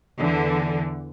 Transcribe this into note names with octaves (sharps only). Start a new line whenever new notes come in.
E2 D3 E3